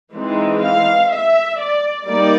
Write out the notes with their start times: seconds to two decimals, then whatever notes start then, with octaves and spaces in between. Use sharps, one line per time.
0.14 E3 G#3 C4 D#4
0.62 F5
1.10 E5
1.59 D5
2.07 G3 A#3 D#4 D5